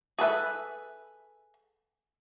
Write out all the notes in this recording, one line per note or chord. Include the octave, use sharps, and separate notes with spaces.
G#4 A4 B4 E5